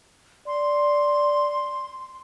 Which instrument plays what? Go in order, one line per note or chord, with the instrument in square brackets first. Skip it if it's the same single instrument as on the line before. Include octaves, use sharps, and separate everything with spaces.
[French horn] D5 [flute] C6